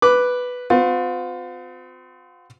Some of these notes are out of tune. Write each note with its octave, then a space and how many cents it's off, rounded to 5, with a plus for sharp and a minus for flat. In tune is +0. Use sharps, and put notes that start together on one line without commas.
B4 +0 D6 +0
C4 -40 F4 +40